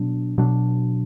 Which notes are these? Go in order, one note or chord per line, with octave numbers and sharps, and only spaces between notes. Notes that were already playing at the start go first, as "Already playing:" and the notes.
Already playing: B2 F#3 B3 D4
B2 F#3 D4